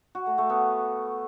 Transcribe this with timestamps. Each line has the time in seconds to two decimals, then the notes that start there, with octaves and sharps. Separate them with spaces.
0.15 F#4
0.26 A3
0.38 A3
0.50 B3